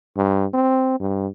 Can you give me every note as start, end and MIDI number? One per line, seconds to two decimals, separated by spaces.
0.17 0.46 43
0.54 0.98 60
1.00 1.28 43